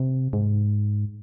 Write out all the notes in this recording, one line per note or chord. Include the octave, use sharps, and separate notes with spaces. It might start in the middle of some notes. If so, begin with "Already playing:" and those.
Already playing: C3
G#2